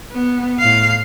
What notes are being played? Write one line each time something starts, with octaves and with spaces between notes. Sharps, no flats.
B3
A2 F5